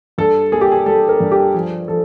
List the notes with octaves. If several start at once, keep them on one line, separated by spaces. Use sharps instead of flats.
G2 A4
A#3 G#4
G4
G#4
G3 A4
A#4
G2
G4
F3 G#4
F3 A4